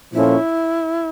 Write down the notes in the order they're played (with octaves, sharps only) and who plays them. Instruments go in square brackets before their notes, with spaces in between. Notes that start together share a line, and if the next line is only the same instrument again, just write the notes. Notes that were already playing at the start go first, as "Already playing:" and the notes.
[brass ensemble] A#2 F3 C#4 F4 A4 [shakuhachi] E4